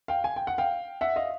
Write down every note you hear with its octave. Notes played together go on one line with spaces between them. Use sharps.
F5 G5
G#5
G5
F#5
F5 G5
E5 F#5
D#5 F5